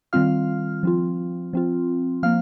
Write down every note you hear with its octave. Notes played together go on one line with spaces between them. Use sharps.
D#3 G3 C4 F4 F5 F6
F3 C4 F4
F3 C4 F4
F3 A#3 F5 F6